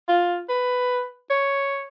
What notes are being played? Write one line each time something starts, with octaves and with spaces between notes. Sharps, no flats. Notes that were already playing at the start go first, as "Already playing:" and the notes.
F4
B4
C#5